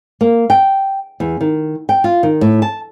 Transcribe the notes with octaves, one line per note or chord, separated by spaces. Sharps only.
A#3
G5
E2
D#3
G5
F4
D#3
A2
A5